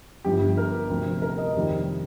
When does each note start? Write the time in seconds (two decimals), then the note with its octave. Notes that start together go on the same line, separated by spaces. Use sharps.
0.25 G1 G2 F3 G4
0.57 A#4
0.90 D2 C3 F3
1.22 A#4
1.38 D#5
1.55 F2 C3 D#3 G3